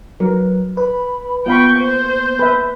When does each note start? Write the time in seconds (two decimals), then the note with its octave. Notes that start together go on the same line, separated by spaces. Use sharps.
0.20 F#3 A#4 B4
0.77 B4 B5
1.46 A#3 B3 F4 F5 G5 B5 C#6
1.79 C5
2.39 B4 E5